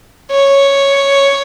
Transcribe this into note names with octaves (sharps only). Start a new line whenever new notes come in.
C#5